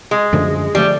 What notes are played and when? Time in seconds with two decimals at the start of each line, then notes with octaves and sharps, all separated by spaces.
0.11 G#3
0.33 F#2 D3 F3 A3
0.75 D3 F3 G3 A3